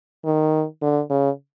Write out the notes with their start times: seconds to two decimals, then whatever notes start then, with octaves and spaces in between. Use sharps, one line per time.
0.25 D#3
0.82 D3
1.10 C#3